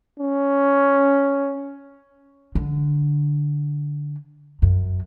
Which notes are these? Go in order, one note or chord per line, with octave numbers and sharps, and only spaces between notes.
C#4
D3
F#2